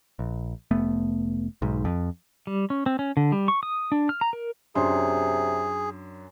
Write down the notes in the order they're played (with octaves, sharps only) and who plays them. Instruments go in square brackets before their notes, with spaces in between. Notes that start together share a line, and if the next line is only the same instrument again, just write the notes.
[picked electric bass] A#1
F1 A3 B3
B1 G#2
F2
[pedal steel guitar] G3
C#4
C4
C#4
D3
G3
C#6
D#6
D4
F6
A#5
A#4
[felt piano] F#2 D4 C6 [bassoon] C3 [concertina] G#4